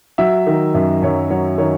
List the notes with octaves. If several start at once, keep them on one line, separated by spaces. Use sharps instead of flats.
F#3 E5
D#3
F#2 E5
F#2 C#5
F#3 C#5
D#3 C#5